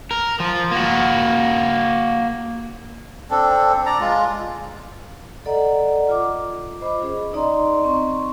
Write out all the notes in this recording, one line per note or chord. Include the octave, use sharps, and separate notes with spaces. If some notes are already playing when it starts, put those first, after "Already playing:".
A#4
F3
A#3 F#4
C4 D4 A4
D5 A#5
G#3 F4
A4 D5 D#5 F#5 A#5
F4 D6
C5 D#5 B5
C#4 G#4
D#4 D5 D#5 A#5 C6
C4 C6 C#6